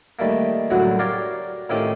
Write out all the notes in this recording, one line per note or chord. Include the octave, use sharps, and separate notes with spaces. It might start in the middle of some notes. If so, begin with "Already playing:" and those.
D#3 G3 A3 A#3
C2 F#2 A2 D3 F#4
G4 A#4 C#5 D5 F5
A2 D#3 C4 C#4 F4 G4